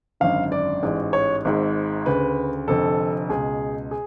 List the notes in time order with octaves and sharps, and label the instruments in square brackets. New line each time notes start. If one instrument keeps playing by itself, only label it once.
[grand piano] G#1 F#2 D3 F5
D5
A1 G#2
C#5
G#1 G#2
D2 C#3 B4
F1 F2 D3 A4
C#2 B2 G#4
G#4